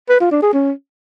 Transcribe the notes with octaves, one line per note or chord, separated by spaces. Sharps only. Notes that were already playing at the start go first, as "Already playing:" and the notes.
B4
F4
D4
G#4
C#4